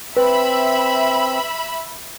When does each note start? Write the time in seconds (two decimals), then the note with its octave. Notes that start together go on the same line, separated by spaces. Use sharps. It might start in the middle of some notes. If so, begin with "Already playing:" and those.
0.17 C4 B4 E5 B5